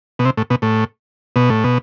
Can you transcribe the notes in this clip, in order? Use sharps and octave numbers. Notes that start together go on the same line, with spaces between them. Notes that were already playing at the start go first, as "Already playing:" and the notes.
B2
C3
A2
B2
A2
B2
A2
B2